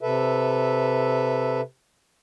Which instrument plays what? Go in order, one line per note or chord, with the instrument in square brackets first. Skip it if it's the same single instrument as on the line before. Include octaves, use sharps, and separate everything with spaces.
[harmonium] C3 A4 B4 E5